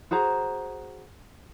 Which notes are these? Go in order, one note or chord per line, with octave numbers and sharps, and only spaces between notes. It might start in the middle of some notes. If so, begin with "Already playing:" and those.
F#4 G#4 C5 A#5